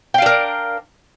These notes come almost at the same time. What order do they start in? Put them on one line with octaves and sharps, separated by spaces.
G5 F5 D4 A#4